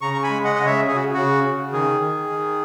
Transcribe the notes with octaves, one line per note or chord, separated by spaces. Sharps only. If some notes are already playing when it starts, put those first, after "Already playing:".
C#3 A#5 C#6
C#6
G#5 B5
G#3
D#5 F#5
C#3 D#5
C#5 E5
C#3 G#4
F#4
C#3 F#4
C#3
D#3 G#4
D#3
D#3